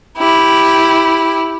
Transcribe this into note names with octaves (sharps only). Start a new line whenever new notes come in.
E4 G4